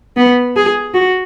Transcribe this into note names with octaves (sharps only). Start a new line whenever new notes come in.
B3
G#4
F#4